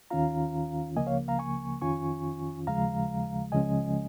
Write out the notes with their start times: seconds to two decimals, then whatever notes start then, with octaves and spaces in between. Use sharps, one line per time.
0.10 D#2 D#3 C#4 F4 F5 A#5
0.96 C#2 C#3 F3 A#3 D#5 G#5
1.07 C#5 F5
1.28 F5 A#5
1.39 G#5 C#6
1.81 F2 D#3 C#4 F4 G#5 C#6
2.67 D#2 C#3 F3 G#3 F5 A#5
3.52 C#2 C#3 F3 G#3 C#4 D#5 G#5